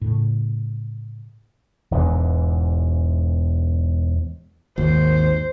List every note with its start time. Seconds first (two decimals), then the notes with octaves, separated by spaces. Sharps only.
0.01 A2 C#3
1.91 E1 E2 G#2 E3
4.78 G#1 D#2 C5